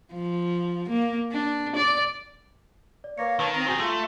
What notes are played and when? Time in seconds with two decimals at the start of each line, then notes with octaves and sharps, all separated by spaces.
0.14 F3
0.89 A#3
1.32 D4
1.76 D5
3.04 D5
3.18 A#3 B4 C#5 F5 A#6 C#7
3.40 D#3 A#4 B4 C#5 A5 B5
3.54 C4 A#5 C7 F7
3.67 C4 F#4 G#4
3.79 A3 F4 C6